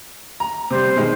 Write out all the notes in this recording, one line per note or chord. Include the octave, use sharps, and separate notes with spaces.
A#5
C3 G3 C5
B2 D#3 G#3